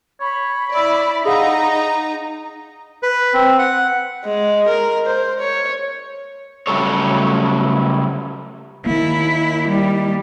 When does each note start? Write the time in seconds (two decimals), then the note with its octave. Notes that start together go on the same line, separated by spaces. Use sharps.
0.21 C#5 B5
0.75 E4 D5 E5
1.25 D#4 G#4 D#5 F5 F#5 A#5
3.03 B4
3.34 C4
3.59 F#5
4.25 G#3
4.68 A#4
5.06 C5
5.39 C#5
6.67 C#3 F#3 G3 A3 A4 C#5
8.86 D#3 A#3 E4
9.68 G3